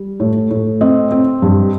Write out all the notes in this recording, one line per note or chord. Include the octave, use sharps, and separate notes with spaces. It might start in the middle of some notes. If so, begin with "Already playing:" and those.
Already playing: G3
A2
A2
C4 D#5
C4
G2